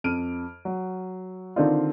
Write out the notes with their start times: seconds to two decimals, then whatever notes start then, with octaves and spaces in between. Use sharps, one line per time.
0.04 F2 F6 D7 D#7
0.65 F#3
1.56 D3 D#3 C4 D4 D#4 F4